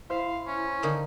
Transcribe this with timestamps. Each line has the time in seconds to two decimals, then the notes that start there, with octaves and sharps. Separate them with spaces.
0.10 E4 C5 E5 F5
0.47 C#4
0.83 D3 D#3 A#3 D#4